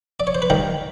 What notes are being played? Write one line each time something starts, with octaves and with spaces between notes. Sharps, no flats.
D5
C#5
C5
B4
D#2 D#3 G3 A#4